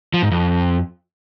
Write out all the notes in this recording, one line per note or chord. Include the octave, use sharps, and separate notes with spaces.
F3
G#2
F2